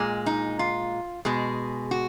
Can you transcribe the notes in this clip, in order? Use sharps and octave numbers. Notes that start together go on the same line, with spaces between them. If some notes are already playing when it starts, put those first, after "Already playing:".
Already playing: A#2 G#3
D#4
F4
B2 G#3 G#4
F#4